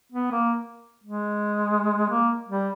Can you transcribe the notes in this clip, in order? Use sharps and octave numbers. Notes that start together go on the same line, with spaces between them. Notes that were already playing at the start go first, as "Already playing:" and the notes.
B3
A#3
G#3
A#3
G3